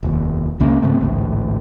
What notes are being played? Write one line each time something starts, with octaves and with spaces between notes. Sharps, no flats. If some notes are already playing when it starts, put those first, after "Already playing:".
F1 D#2
C#2 C#3 A#3 C#4
G#2 C#3 A3 C4
A1 D2 G#2